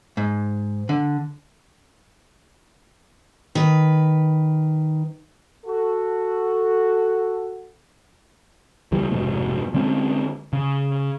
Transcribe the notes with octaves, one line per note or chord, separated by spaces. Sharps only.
G#2
D3
D#3 B4
F#4 A4
C#2 E3 G3
F1 G#2 B2
D3 G#3 C4 C#4
C#3